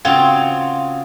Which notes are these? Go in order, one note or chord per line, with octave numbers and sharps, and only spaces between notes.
C#3 C4 F4 F#4 C#5